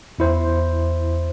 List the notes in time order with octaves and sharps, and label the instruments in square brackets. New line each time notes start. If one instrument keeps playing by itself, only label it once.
[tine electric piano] E2 E4 C5